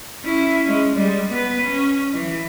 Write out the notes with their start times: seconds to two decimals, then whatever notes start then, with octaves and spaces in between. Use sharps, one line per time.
0.22 C#4 E4
0.65 G#3 C#4
0.96 G3 G#3
1.28 B3 B4
1.61 C#4
2.13 E3